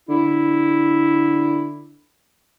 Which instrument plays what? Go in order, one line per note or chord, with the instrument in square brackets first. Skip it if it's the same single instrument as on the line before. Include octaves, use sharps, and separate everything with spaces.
[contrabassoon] D3 [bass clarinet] E4